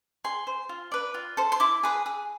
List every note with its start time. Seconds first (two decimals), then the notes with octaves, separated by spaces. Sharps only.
0.24 G#4 C6
0.47 C5
0.69 F4
0.92 B4 D5
1.14 F4
1.37 A4 C5
1.52 C6
1.60 E4 D6
1.83 G#4 B4
2.06 G#4